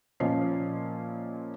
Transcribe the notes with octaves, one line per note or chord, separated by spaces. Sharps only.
A#2 F3 C#4 D#5 C7